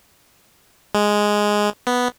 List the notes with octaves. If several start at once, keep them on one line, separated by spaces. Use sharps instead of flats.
G#3
B3